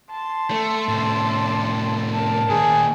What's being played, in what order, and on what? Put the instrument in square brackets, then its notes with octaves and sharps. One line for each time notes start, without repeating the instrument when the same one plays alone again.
[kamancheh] A5 C6
[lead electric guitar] A3
A2 C3
[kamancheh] A#4 A5
[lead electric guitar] A#2 D#3 [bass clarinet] G#4